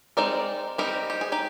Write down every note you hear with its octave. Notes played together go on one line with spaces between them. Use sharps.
G#3 C4 D#4 A#4 D5
G3 C4 D#4 G4 A#4
G4
G#4
D#4 G4